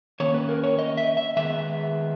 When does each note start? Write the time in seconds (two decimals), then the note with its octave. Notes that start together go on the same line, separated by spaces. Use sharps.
0.20 D#3 A#3 C#4 C#5
0.34 B4
0.49 A#4
0.64 C#5
0.79 D#5
0.97 E5
1.17 E5
1.36 D#3 G#3 B3 E5